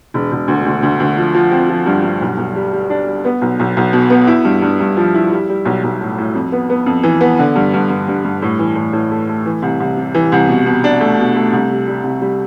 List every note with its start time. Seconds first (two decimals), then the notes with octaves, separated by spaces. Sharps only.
0.14 E1
0.32 E1
0.48 D2
0.66 D2
0.83 D2
1.00 D2
1.17 F3
1.35 F3
1.51 C4
1.70 F3
1.86 G2
2.04 G2
2.21 B1
2.37 B1
2.55 G3
2.73 G3
2.90 D4
3.07 G3
3.25 B3
3.42 B1
3.59 B1
3.77 B1
3.93 B2
4.10 B3
4.27 E4
4.45 G2
4.62 G2
4.80 G2
4.97 F3
5.15 E4
5.32 G3
5.49 G3
5.65 B1
5.83 B1
6.01 A2
6.18 A2
6.35 F2
6.52 B3
6.70 B3
6.86 F2
7.03 E3
7.21 B3
7.39 D3
7.56 G2
7.74 G2
7.90 G2
8.08 G2
8.25 G2
8.42 A2
8.59 E3
8.76 A2
8.93 A2
9.11 A3
9.29 A3
9.46 E3
9.62 C2
9.80 C2
9.97 C3
10.15 E3
10.32 C2
10.49 B2
10.66 B2
10.84 D4
11.00 A3
11.19 B2
11.36 A3
11.52 C2
11.70 C3
11.88 G3
12.04 C2
12.22 G3